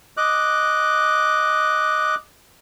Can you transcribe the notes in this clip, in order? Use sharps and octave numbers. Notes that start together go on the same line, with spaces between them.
D#5 D6 F#6